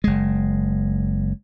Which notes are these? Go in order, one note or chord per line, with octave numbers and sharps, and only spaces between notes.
F#1 G#3